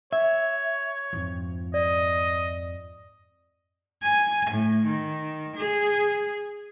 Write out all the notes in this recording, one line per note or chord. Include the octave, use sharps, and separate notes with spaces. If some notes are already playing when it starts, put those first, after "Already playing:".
C#5 E5
F2 G#2 F3
D5 D#5
G#5
A2
D#3
G#4